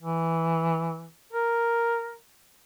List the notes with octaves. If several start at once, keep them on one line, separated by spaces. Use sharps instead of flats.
E3
A#4